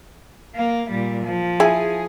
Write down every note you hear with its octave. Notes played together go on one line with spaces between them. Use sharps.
A#3 F5
A#2 G3
F3
E4 G#4 G#5